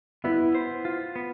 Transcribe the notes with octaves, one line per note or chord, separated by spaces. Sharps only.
B3 E4
C5
F4
B3